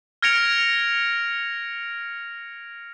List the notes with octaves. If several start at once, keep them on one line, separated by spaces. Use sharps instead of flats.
F6 G#6 A#6 C#7 D7 F7